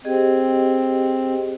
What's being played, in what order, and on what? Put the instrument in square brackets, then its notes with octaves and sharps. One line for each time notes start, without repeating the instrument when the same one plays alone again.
[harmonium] C4 [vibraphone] G4 G#4 D#5